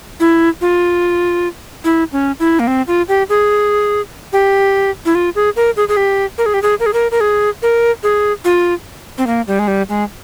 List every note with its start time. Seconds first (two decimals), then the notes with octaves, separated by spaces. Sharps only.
0.20 E4
0.61 F4
1.84 E4
2.12 C#4
2.40 E4
2.60 A#3
2.67 C4
2.88 F4
3.09 G4
3.29 G#4
4.33 G4
5.05 E4
5.15 F4
5.35 G#4
5.56 A#4
5.77 G#4
5.89 G#4
5.97 G4
6.38 A#4
6.46 G#4
6.54 G4
6.62 G#4
6.80 A#4
6.86 G#4
6.93 A#4
7.11 A#4
7.21 G#4
7.62 A#4
8.03 G#4
8.45 F4
9.18 C4
9.27 A#3
9.47 G3
9.59 G#3
9.68 G3
9.89 G#3